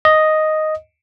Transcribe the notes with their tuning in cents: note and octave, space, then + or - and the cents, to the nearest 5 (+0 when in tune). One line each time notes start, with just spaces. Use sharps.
D#5 +0